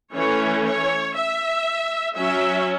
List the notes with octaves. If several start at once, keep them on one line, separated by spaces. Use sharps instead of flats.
E3 A3 C#4 C#5
C#5
E5
F#3 C#4 E5